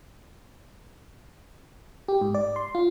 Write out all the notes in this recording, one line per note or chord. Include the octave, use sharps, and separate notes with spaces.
G4
G#2
D5
C6
F4